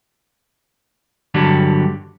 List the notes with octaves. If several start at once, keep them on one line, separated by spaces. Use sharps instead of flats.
G2 D3 F#3 G3